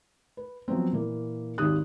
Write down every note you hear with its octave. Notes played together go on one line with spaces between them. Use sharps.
B4
F3 F#3 B3 C4
A#2 E3 A#3
G#1 D#2 G4 D#6 F#6